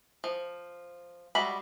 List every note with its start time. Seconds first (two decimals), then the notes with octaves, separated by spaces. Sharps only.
0.24 F3
1.35 G3 G#3 F#4 E5 B5